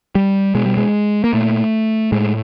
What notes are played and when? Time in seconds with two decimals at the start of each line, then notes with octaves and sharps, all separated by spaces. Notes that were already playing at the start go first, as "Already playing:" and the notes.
0.15 G3
0.55 B2 G#3
0.66 G3
0.77 G#3
1.24 A#3
1.33 A#2 A3
2.12 A2 G#3